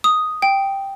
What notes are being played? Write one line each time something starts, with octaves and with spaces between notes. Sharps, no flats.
D#6
G5